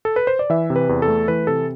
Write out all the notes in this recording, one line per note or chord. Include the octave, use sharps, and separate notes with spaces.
A4
B4
C5
D5
E3 E5
C3
B4
E2
A4
A3
E3 B4
C3 A4